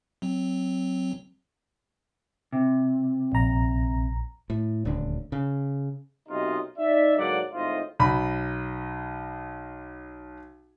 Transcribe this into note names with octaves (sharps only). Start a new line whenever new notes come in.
F#3 C4
C3
A#1 A#5
A2
D#1 D2 D3
C#3
B1 F#2 C3 D#4 F4 D#5
D#4 D5 E5
G#2 D3 F#3 A#3 D5 F#5
G#1 A2 D#4 F4 C5 D#5
B1 B5